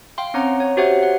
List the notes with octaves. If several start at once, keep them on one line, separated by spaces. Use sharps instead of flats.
F5 G5 C6
C4 C#4 C#5 F#5 A#5
C#5
F#4 G4 C5 C#5 E5 F#5
F#5